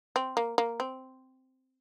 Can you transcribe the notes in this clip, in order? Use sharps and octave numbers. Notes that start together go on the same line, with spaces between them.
C4
A#3
A#3
C4